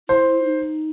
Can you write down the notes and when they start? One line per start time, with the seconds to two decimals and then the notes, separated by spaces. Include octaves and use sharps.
0.09 E4 C5
0.44 D#4